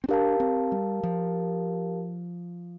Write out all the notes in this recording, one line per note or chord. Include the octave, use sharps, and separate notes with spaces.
C4
D4 G4 A#4 F5 A5
C4
G3
F3